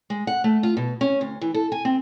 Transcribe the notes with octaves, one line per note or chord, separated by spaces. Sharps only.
G#3
F#5
A3
F4
B2
C#4
D2
E3
A4
G#5
C4